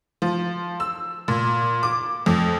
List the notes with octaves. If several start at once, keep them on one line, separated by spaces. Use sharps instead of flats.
F3
E6
A#2
D6
F2